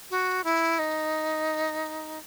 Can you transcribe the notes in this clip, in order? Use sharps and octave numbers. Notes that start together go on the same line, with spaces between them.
F#4
E4
D#4